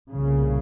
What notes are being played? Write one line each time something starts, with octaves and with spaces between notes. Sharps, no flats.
C2 A#2 C#3